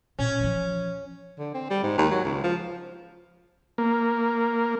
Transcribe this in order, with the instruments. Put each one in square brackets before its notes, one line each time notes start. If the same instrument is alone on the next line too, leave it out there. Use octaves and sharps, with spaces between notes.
[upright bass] A#2 [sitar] C#4
[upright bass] E3 F3
[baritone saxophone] D3
C4
G3
G#2
D#2
F#3
C#2
F3
[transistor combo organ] A#3